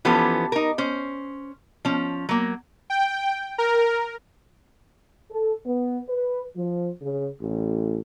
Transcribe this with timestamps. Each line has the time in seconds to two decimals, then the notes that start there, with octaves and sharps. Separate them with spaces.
0.05 E3 F3 B3 C#4 G4 A4
0.52 D#4 A#4
0.78 C#4 C5
1.85 F3 C#4
2.29 F#3 A#3
2.90 G5
3.58 A#4
5.30 A4
5.66 B3
6.08 B4
6.56 F3
7.02 C#3
7.42 A1